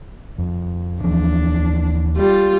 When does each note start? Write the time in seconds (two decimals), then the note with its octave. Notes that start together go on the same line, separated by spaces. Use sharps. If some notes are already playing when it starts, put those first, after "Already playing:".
0.38 F2
1.03 D#2 E3 F3 D4
2.17 G3 F4